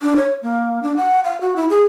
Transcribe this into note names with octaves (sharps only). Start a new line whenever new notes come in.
D4
C#5
A#3
D4
F#5
F5
F#4
E4
G#4